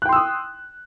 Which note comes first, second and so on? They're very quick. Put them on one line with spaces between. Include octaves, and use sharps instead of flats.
F#6 G5 C6 E6 D#6